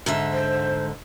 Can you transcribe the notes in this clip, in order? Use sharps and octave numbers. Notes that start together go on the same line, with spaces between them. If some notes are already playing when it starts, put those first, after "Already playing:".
G#2 D3 E5
C5